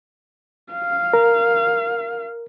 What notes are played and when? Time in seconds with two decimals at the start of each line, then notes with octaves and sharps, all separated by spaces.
0.73 F5
1.13 A#4